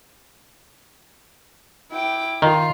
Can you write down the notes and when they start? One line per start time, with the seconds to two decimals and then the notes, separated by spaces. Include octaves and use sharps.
1.90 E4 G5 D6
2.42 D#3 F4